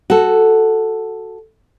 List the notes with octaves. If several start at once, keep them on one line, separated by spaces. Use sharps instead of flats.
F#4 A4